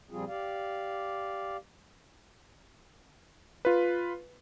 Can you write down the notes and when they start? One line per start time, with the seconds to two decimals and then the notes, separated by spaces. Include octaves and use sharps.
0.10 A#2 F3 G3 C4 F4 G#4
0.28 G4 D5 F5
3.65 F4 B4